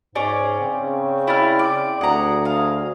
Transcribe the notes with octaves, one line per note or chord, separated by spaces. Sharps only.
G#2 C#4 G#4 D5
C#3 C4
E4 D5 F6
D5
D2 G#4 F#5 A#5
F5